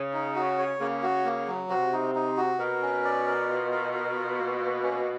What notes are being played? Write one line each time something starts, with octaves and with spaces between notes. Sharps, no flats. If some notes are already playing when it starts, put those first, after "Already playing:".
Already playing: C#3
D#4
F#4
C#5
C#3 A#3
F#4
A#3
F#3
C3 F#4
D#4
D#4
F#4
B2 A#4
C#4
D5
A#4
F4
A#4
A#4
F4
A#3
A#3
C#4